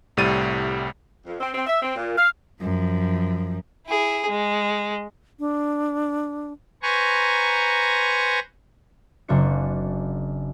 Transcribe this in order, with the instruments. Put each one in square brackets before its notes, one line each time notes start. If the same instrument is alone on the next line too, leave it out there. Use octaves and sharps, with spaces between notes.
[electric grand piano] C2 A2 C3 G3 A6 D#7
[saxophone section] F2
C4
C4
E5
C4
A#2
F5
[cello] F#2 F3
[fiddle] E4 G#4
G#3
[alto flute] D4
[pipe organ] B4 C5 G#5 A#5 C#6
[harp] F#1 C#3 C4 D4 F#4 C#7